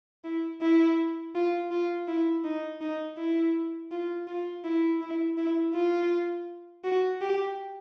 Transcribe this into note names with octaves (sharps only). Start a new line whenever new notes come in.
E4
E4
F4
F4
E4
D#4
D#4
E4
F4
F4
E4
E4
E4
F4
F#4
G4